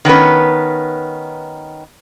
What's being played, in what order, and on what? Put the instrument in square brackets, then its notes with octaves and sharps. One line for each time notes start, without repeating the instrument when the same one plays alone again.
[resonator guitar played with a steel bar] D#3 B3 C#4 B4